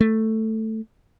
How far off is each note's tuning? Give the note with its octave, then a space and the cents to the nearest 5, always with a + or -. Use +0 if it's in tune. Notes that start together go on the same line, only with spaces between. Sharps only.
A3 +5